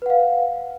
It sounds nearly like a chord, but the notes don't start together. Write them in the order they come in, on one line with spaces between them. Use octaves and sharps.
B4 F#5 F5